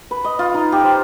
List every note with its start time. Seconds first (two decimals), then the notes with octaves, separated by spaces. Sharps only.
0.11 B4
0.24 D#5
0.39 F4
0.54 D#4
0.72 G4
0.84 C5